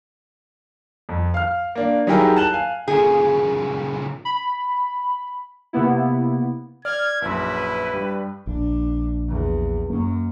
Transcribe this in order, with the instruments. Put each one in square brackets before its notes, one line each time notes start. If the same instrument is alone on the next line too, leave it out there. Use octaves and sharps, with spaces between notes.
[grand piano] F2
F5 F6
A#3 D4
F#3 D#4 E4 G4 G#4 A#4
A5 F#6 E7 F#7 G7
F5 G#5
[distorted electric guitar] A#2 C#3 [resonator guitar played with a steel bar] G#4
[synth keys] B5
C3 A#3 B3 E4
[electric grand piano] D5 [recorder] F6 [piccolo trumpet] G#6
[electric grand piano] A#1 F#2 [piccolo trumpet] E4 [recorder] B4
[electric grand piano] G2 G3
[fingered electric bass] A#1 [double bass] D4
[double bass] E2
[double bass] F#2 [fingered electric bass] A#3 C#4